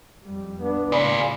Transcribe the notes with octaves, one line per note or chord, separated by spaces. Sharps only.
F2 G3
B3 D4
A2 C#3 F4 G#4 D5 B5